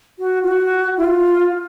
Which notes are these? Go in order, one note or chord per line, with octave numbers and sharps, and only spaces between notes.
F#4
F4
F#4
E4
F4